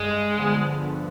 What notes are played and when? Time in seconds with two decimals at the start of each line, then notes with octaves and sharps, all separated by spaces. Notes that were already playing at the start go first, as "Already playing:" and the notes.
Already playing: G2 G#3
0.38 D3 F3 B3
0.84 G2